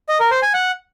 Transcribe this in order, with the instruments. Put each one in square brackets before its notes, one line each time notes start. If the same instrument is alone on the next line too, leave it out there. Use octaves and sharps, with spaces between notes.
[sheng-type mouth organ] D#5
A#4
C5
G#5
F#5